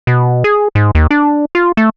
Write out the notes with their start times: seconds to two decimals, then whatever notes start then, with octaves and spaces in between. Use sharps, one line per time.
0.07 B2
0.44 G#4
0.75 G#2
0.95 D#2
1.11 D4
1.55 F4
1.77 A3